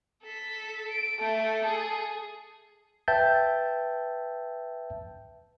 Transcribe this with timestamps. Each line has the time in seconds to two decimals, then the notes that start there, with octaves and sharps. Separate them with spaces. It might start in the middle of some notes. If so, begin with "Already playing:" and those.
0.23 A4 B6
0.90 D7
1.20 A3 A4
1.64 G#4
3.08 B4 E5 G5 A5 G6 A6